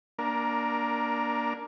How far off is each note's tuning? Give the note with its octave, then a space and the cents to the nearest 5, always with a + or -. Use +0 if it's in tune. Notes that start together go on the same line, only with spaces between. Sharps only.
A#3 +20 D4 +0 A#4 +0